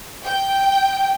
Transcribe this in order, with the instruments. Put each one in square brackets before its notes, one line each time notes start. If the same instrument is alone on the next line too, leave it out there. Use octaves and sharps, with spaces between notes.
[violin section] G5